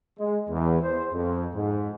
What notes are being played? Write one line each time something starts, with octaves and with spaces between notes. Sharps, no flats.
G#3
E2
C5
F2
G#2